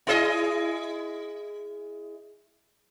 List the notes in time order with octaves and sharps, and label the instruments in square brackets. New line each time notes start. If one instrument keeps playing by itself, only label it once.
[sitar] E4 G#4 D#5